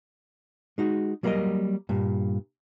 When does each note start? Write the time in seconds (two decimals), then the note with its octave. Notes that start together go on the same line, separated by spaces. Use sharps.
0.78 G#3 D#4 F#4
1.23 F#3 G3 A#3 A4 A#4 D#5
1.89 G2 A#2